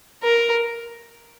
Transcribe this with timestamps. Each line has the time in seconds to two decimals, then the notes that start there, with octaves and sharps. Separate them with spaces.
0.23 A#4